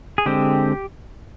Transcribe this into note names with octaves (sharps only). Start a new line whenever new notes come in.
G#4
D3 G#3 C4 G4